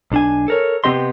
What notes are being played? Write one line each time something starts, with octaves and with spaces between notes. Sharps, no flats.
B1 D4 G#5
A4 A#4 C#5
C3 B3 C4 G4 D#5 C6